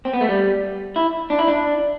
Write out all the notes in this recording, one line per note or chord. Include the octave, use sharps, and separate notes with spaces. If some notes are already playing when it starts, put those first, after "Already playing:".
C4
B3
A3
G3
E4
D4
E4
D4